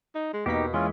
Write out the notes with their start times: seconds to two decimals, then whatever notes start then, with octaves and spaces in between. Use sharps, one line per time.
0.15 D#4
0.33 G#3
0.46 E2 B2 A#3 D#4 G4 B6
0.74 E3 G#3 C#4 F4